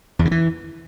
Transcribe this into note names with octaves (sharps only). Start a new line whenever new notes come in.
E2
C#3
E3